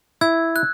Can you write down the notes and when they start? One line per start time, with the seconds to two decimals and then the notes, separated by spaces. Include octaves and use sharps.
0.21 E4 E6 G#6
0.56 F#6